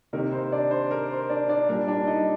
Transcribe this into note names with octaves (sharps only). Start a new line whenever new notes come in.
C3 D#3 A#3 D#4 A#4
C5
D4 D5
C5
A#4
C5
D4 D5
D4 D5
A#2 G3 D4 A#4
D4 D5
D#4 D#5